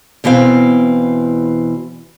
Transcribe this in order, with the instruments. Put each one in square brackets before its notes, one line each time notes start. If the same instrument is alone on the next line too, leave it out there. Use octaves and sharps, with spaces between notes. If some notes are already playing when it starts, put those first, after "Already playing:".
[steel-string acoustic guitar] E2 B2 E3 C4 F5